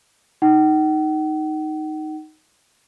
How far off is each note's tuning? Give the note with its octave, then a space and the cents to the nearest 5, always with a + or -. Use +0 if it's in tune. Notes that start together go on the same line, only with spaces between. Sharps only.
D#4 +0 F#5 +45